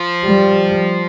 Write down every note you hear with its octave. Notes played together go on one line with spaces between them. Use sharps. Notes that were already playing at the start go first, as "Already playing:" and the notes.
Already playing: F3
G3